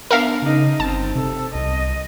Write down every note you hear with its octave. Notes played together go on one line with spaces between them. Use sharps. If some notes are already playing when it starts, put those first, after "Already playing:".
B3 D4 A#4 E5 F5
C#3 D#4 D#5
G1 C4 A5
C3 A4
C2 D#5